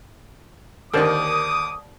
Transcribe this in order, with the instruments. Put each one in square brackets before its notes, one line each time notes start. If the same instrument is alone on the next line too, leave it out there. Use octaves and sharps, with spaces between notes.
[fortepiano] D#2 D3 D#3 [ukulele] A#4 C5 D5 [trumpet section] D6 D#6